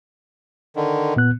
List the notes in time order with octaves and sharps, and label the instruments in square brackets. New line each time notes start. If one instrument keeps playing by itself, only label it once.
[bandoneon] D3 D#3
[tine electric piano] A#2 B3 F#6